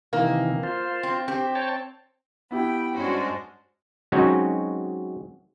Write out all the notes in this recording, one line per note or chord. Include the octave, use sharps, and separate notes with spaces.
C3 D#3 E3 A#3
F4 C5
C4
C4 G4
C#5 G5 A5
B3 E4 G4 G5 B5
G2 G#3 C#4 D4 F#4 C5
F#3 G#3 C4 C#4 D#4 F#4